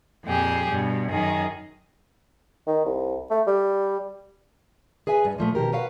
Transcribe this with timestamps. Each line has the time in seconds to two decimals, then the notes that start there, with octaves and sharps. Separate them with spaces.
0.24 F2 A#2 G4 G#4
0.69 G2 B2
1.09 F#2 D#3 G#4
2.67 D#3
2.85 C2
3.31 A3
3.47 G3
5.07 G#4 B4 E5 G#5
5.25 G2
5.38 A#2 F3 A3
5.55 B2 D#3 G4 A#4
5.72 A#4 B4 C#5 F5 F#5